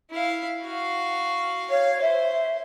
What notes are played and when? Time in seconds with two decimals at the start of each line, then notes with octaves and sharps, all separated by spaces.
0.10 E4 F5
0.63 F#4 F5
1.70 C#5 F5
2.02 C5 E5